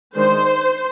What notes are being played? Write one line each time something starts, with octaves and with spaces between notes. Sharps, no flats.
D#3 G#3 D4 C5